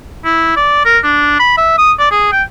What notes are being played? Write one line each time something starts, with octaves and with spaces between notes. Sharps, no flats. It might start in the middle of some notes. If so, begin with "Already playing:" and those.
E4
D5
A#4
D4
B5
E5
D#6
D5
G#4
G5